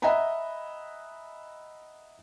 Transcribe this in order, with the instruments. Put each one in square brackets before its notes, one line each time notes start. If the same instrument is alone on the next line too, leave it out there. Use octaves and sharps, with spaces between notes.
[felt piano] D#5 E5 F#5 G#5 A#5 B5